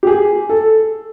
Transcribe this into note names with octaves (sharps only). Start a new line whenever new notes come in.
G4
G#4
A4